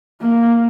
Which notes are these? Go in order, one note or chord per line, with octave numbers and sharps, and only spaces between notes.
A#3